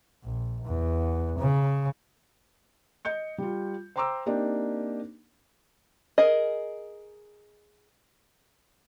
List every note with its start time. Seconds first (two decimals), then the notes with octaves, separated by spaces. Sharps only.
0.24 A#1
0.65 E2
1.39 C#3
3.05 D#5 G6 C#7
3.38 G3 F4
3.96 C5 G5 A#5 C6 D6 E6
4.26 A#3 C4 D4 D#4 G4
6.18 G#4 A#4 D#5